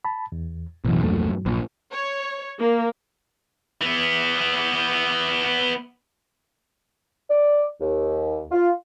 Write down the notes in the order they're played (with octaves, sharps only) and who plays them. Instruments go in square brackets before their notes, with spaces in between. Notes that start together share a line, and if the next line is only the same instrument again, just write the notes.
[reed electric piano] A5 B5
E2
[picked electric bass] A1 F#2 [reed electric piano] B2 E3
[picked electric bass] A#1 E2 A3 [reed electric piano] G2 F#3
[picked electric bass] A#1 A#2
[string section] C#5
A#3
[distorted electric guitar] E3 B3
[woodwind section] D5
D#2
F4